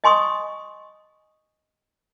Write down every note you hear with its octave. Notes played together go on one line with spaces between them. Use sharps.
D#5 G#5 C6 C#6 D#6